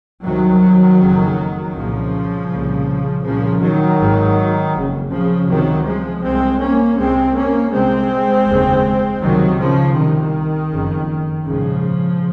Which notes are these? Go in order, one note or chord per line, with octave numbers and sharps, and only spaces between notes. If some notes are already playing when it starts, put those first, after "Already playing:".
C2 C3 D#3 F#3
F#1 F2 C#3
C2 A#2 C#3 F3
C2 A#2
C2 A#2 C#3 F3
D#3 F#3
G#1 G#2
F#1 F2 C#3
C#3 F3
C#2 C3 D#3 F#3
F3 G#3
C2 C3 G#3 C4
A#3 C#4
C2 C3 G#3 C4
A#3 C#4
C2 C3 G#3 C4
F1 D#2 C#3
C#2 C3 D#3 F#3
C#3 F3
C2 C3 D#3
F#1 F2 C#3
A#1 G#2 C#3 F3